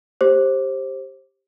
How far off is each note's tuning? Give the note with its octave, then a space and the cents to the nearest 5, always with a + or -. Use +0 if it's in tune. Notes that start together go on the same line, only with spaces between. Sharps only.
G4 +0 C5 +20 D6 +0